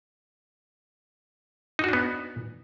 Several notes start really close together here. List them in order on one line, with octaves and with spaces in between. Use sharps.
D#4 F#4 D4 B3